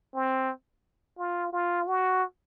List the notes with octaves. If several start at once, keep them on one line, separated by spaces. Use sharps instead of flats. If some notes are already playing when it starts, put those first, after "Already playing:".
C4
F4
F4
F#4